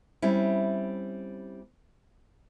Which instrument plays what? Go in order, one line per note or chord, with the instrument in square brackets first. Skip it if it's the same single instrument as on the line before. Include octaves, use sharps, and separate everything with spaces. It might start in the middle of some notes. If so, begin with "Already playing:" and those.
[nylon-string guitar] G3 C4 C#4 E4